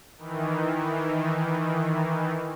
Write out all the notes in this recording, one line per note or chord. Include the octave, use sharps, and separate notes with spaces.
D#3 E3